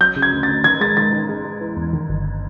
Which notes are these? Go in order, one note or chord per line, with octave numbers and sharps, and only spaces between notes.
F#3 G6
C#3
G#6
D2
D2 A6
D#3 G#6
G#3 A6
D#3 A6
D#3
G#3
G#3
E3
E2
D#3
G1